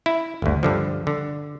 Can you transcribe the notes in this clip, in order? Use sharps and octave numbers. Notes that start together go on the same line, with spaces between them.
E4
G1 D2
G2 D3 F3
D3